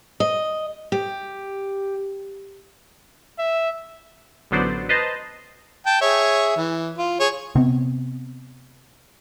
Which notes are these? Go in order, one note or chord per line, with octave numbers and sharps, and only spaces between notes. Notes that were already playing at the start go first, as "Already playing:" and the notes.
D#5
G4
E5
A1 D3 F#3 B3 C5 D5
B4 C5 D#5 A5 A#5 C6
G5 A5
G#4 C#5 E5
E3
F4
G#4 C#5
C3 B3 C4